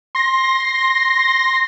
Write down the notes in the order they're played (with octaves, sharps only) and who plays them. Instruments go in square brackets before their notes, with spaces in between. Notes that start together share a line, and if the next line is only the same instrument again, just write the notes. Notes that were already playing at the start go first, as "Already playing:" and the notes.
[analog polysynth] C6 A#6